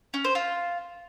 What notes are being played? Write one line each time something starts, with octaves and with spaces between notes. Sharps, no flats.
C#4
C5
F4